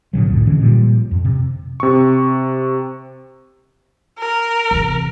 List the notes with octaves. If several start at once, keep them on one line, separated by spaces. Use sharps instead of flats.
G#1 B2 D3 F#3
C2 F2 A2
D3 E3 G#3 C#4
A#2 F3 G3
F2
C3
C3 C#6
A#4
E2 C3